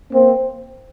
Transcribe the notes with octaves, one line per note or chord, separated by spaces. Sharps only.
A#3 C4